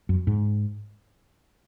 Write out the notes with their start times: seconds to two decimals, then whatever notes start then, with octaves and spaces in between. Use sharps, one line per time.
0.09 F#2
0.27 G#2